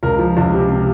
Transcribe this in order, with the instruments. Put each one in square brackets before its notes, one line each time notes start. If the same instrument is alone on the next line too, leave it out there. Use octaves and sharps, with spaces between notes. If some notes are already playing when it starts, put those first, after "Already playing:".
[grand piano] C#2 A#4
F3
C#2
C3
C3